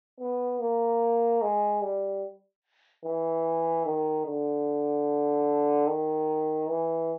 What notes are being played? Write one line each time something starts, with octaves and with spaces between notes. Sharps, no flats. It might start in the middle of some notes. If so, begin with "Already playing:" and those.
B3
A#3
G#3
G3
E3
D#3
D3
D#3
E3